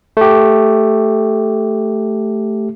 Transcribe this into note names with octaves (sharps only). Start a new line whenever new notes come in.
A3 G4